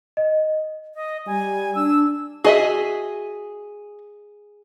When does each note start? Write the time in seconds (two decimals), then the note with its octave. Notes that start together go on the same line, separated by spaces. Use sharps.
0.17 D#5
0.95 D#5
1.27 G3 G#5
1.75 D4 E6
2.44 F#4 G#4 D#5 E5